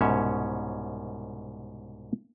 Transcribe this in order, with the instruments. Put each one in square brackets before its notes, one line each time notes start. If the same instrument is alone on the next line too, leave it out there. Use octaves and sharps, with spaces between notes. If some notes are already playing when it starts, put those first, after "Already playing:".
[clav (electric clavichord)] C2 G#2 B2 C#4 C#5 E5